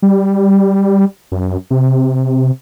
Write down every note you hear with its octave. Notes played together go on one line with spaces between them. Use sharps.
G3
F#2
C3